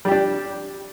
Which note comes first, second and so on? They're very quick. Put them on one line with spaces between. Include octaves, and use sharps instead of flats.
G3 G4 D4